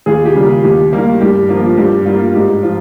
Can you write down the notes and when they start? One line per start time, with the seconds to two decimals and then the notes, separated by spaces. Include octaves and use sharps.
0.06 D#2 F4 G#4
0.25 G4
0.35 C#3 G3 A#3
0.45 F4
0.63 D#2 G4
0.93 D#3 G3 A#3
1.21 G2 G4
1.49 F3 A#3 F4
1.77 G2 G4
2.06 G3 A#3 F4
2.35 G#2 G4
2.63 F3 F4